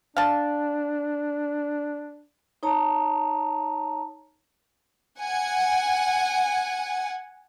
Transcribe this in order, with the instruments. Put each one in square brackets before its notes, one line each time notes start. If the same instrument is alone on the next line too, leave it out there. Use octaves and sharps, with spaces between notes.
[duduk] D4 [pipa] F5 A5
[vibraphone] D#4 C#5 A5 A#5
[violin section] F#5 G#5